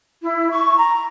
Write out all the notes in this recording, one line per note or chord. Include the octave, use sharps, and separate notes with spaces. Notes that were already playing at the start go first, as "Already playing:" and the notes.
E4
C#6
A#5